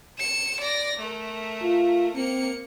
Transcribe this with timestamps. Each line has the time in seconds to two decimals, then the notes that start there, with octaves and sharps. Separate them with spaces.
0.19 C#7 E7
0.61 D5 A#6
1.00 A3 A#4
1.62 F4
2.16 A#3 C4 C#7